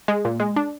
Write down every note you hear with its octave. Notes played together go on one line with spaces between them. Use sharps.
G#3
A#2
G#3
D4